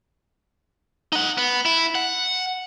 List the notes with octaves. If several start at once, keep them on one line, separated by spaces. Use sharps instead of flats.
D#4 F#5
B3
E4
F#5